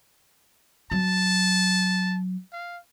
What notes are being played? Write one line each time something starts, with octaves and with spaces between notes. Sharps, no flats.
F#3 A5
F5